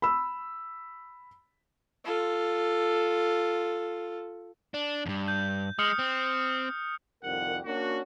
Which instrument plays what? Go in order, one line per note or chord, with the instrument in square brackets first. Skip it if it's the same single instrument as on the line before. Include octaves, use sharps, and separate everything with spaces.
[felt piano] B5 E6
[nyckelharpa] F4 A4
[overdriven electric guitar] D4
E2 G2
[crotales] G6
[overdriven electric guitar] G#3 [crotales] D#6 F6 C#7
[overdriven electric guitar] C4
[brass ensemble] C2 F2 D#3 G3 A#4 F#5
A#3 C#4 D4 F#4